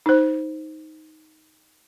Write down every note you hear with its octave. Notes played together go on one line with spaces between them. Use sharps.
D#4 C5